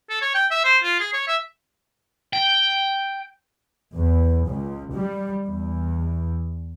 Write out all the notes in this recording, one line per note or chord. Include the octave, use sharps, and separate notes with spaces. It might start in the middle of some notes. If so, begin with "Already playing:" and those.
A4
C#5
G5
E5
C5
F4
G#4
C#5
E5
G5
E2
C#2
G3
E2